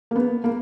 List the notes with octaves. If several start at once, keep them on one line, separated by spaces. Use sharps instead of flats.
A#3
B3
A#3